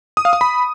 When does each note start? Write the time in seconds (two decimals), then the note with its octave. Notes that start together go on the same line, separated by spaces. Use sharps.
0.17 D#6
0.25 F5
0.33 D#6
0.41 B5